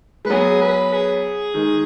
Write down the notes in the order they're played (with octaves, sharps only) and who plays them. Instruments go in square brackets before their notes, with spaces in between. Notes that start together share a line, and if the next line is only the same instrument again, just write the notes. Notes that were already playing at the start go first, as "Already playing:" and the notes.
[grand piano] G#3 [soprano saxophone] B4
[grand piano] F#3 B3 [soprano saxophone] G#4
[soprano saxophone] B4
G#4
[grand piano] D#3 G#3